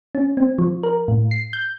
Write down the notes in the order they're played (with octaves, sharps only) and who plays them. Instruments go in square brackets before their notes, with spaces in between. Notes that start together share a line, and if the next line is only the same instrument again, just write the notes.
[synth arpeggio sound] C#4
C4
F3
A#4
A2
C7
G6